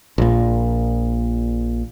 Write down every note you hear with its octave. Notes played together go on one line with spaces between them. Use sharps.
A#1 A#2